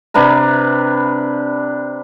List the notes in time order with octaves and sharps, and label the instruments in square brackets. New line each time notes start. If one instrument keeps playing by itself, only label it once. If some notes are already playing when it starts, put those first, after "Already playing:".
[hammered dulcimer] C3 D4 B4 A#5